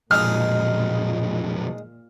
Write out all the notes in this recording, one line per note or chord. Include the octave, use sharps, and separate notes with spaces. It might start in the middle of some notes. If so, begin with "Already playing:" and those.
B1 F2 A#2 G#3 D#4 F6